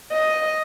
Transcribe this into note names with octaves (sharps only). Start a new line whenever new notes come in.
D#5